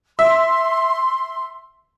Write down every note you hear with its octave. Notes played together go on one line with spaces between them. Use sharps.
E5 C6